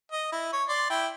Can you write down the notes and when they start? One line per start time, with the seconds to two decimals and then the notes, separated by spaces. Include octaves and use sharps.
0.12 D#5
0.32 E4
0.53 C#5
0.69 D5 C6
0.90 E4 G5